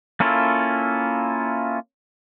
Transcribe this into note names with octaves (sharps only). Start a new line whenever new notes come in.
A#3 C#4 E4 F4 A4